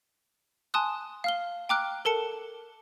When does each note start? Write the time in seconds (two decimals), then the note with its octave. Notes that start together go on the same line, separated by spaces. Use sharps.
0.74 G#5 A5 C6 D#6 F#6
1.24 F5 F6 G7
1.69 G5 A#5 D6 F6 F#6 D7
2.05 A4 A#4 A5 C#7